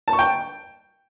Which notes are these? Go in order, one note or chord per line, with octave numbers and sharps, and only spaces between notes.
A5
C#6
G5